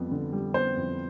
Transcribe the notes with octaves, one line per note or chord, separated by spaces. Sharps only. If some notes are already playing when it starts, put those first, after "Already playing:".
Already playing: F2 G3 B3
D3
G3
B3 C5
F2